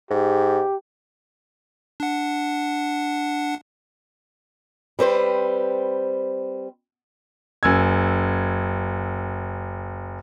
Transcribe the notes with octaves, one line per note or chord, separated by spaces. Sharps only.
G#2 G4
D4 F#5
G3 C4 B4 C5
F#1 G#5 E6 G#6